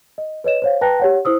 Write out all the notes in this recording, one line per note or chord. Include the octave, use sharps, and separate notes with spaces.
D#5
B4 C#5 D#5 E7
C5 C#5 F5
B4 G5 A5 A#5 F#6 A#6
G4 C#5 F#5
E4 C5 D#6 E6